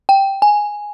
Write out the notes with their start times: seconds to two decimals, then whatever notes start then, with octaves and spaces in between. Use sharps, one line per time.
0.09 G5
0.42 G#5